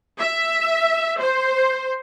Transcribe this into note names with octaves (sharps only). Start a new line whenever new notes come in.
E5
C5